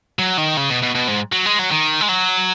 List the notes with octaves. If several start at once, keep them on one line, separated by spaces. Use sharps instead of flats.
F#3
D#3
C#3
B2
B2
B2
G#2
F#3
G#3
F#3
D#3
G#3
F#3